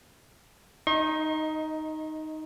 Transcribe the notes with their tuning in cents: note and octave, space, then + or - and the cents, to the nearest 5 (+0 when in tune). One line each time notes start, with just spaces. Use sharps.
D#4 +0 D#5 +20 C#6 -45